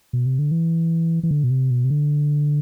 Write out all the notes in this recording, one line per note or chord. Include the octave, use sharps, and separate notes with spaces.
B2
C3
D3
E3
E3
D3
B2
C3
B2
C3
D3